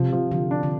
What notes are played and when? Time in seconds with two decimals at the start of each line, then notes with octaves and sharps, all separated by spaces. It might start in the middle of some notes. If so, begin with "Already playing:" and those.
Already playing: C3 F3
0.12 F3
0.32 D3 F3
0.51 D4
0.63 D3